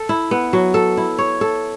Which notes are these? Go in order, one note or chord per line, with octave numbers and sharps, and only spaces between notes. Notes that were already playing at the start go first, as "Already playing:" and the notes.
Already playing: A4
E4
B3
F#3
A4
E4
C#5
A4